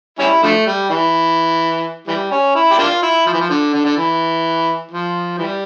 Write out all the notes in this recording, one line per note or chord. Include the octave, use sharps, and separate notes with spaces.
G3 C#4 E4
D3 F3 A3
G3
E3
E3 G3
C#4
E4
G4
A#3 D4 F4
E4
F3
E3
F3
D3
D3
D3
E3
F3
E3 G3